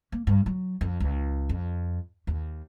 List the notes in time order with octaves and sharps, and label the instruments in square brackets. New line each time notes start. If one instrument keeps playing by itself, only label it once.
[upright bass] A#3
G2
F#3
F2
C#2
F2
D#2